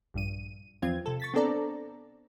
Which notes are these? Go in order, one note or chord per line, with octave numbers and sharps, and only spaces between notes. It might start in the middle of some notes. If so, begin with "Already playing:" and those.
A#1 G2 D#7
E2 F3 C4 F4 G#6
C3 A4
C#6 A6 B6
B3 C4 D4 A4 D5 A#5